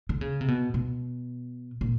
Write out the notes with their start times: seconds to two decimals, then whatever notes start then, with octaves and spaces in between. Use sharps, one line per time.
0.09 D3
0.21 C#3
0.41 C3
0.48 B2
0.74 B2
1.81 A#2